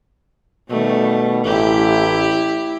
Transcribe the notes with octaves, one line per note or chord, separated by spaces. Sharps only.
B2 D#3 G3 A3
A1 E4 G4